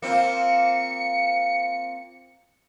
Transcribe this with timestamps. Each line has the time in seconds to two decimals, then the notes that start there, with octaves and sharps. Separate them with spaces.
0.02 A#3 C4 F4 C#7